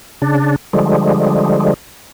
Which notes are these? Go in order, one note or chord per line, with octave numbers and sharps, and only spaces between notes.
C#3 D4
D3 F3 G3 G#3